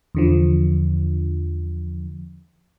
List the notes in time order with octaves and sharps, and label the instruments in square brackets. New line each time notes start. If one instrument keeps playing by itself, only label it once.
[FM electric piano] E2 D3 F3